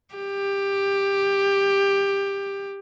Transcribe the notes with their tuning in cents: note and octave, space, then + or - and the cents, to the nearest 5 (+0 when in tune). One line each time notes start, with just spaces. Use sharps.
G4 +15